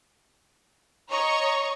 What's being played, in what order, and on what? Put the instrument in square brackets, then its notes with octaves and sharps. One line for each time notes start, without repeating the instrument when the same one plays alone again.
[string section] C#5 D#5 A#5 C#6